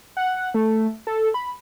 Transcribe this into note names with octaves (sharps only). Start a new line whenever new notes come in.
F#5
A3
A4
B5